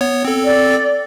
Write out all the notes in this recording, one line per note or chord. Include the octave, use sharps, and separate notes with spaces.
B3 C#5
C4 A4
D5